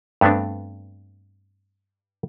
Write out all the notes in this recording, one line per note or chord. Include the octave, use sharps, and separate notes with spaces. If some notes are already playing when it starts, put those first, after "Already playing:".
G2 A3 B3 C4 D4